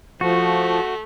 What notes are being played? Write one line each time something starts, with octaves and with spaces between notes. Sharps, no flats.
F3 A3 F#4